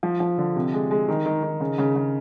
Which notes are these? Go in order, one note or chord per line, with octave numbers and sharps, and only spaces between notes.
F3
F3
D3
C3
G#3
G#3
D#3
D#3
D#3
C#3
C#3
C#3